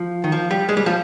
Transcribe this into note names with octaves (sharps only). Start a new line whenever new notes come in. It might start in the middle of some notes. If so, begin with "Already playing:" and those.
Already playing: F3
D#3
F3
G3
G#3
G3
F3